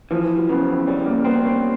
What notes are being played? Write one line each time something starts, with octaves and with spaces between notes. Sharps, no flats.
E3 F3
F#3
C#3 B3
C4
G3 C#4
A#3
B3 C4
C#4